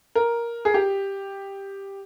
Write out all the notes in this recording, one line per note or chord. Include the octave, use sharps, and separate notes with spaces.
A#4
G#4
G4